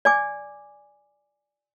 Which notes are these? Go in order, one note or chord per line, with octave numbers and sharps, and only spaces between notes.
D5 G#5 D6